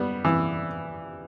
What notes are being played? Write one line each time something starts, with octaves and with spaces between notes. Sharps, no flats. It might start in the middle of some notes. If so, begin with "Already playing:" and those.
Already playing: G3 B3
E3